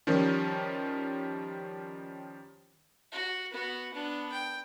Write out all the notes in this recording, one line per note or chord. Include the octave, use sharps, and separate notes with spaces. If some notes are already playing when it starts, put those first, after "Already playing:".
D#3 F3 G3 C#4
F#4
B3 F#4
B3 D4
G5